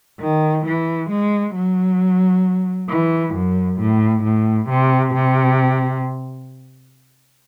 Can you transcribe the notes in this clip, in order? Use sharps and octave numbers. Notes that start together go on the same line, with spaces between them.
D#3
E3
G#3
F#3
E3
F#2
A2
A2
C3
C3